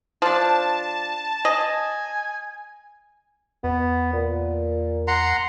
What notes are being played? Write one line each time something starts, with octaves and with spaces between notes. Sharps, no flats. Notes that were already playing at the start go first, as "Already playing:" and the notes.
F3 D4 A5
D#5 G#5
E2 B3
A#2
F#5 A#5 C6